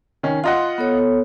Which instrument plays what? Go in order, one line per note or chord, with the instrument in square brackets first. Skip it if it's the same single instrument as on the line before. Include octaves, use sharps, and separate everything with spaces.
[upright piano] D#3 C#4
[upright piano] F4 D#5 F#5 [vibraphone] C6
[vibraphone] B3 A4 C#5